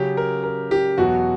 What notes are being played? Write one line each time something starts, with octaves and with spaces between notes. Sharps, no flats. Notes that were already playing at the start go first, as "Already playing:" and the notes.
Already playing: C#3 F#3 C#4 G4
A#4
A#4
G4
E2 B2 F#3 F#4